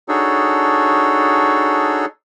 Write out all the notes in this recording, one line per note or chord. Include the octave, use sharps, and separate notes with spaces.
D4 D#4 F#4 G#4 A4 C#5